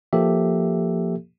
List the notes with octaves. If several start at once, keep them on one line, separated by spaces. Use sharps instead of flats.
F3 A#3 G4 A4 E5